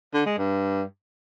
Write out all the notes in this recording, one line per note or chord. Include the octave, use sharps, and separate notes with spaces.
D3
G#3
G2